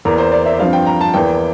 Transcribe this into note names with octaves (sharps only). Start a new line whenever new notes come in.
E2 E3 A#3 A#4
C5
D5
E5
G2 F3 C4 F5
G5
A#5
A5
E2 E3 A#3 G5